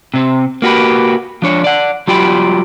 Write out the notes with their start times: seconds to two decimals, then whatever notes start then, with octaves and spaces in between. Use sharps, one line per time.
0.14 C3 C4
0.62 A#3 F#4 G4 B4
1.42 F3 D4 C#5
1.64 D5 F#5
2.08 F#3 G3 F4 G4 G5 B5